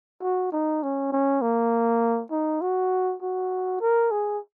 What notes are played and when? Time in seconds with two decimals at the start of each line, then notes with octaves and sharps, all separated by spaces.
0.22 F#4
0.52 D#4
0.83 C#4
1.12 C#4
1.42 A#3
2.31 D#4
2.61 F#4
3.22 F#4
3.81 A#4
4.11 G#4